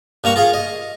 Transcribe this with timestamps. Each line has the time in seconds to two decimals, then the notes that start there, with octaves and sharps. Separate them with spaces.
0.24 G2 A#3 A#5 C#6
0.36 F4 G#4 F5
0.54 D#5